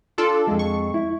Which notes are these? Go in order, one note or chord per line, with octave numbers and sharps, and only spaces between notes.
D4 F4 A4
F2 G#3
C#6
E4